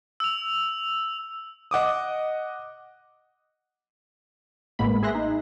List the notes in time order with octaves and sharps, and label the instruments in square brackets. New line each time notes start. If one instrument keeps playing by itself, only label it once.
[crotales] E6 F7
[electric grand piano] D#5 F#5 D6 D#6
[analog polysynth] A1 A2 G#3 A#3 B3 B5
G#4 E5 C6 F#6 A#6
D#4